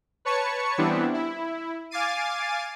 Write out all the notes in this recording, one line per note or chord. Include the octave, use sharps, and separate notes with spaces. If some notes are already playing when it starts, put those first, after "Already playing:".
B4 C#5 A5 C#6 C#7
E3 G3 B3 C4 D4 E4
E4
F5 G#5 D6 A6 C7 D#7